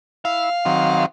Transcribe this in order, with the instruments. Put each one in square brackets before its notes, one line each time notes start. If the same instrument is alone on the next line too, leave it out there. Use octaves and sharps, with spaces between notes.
[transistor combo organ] E4 [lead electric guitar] F5
[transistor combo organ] D#3 F#3 C4